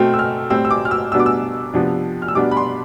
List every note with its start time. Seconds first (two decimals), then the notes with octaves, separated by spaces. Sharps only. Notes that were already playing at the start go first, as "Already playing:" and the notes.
Already playing: B2 A3 C4 F6
0.14 E6
0.19 F6
0.50 A2 G3 C4 E6
0.65 E6
0.71 D6
0.85 F6
0.91 E6
1.12 B2 G3 B3 D4 E6
1.20 D6
1.26 E6
1.74 C3 F3 B3 D4
2.22 F6
2.28 E6
2.35 B2 G3 B3 D4 D6
2.51 B5
2.57 C6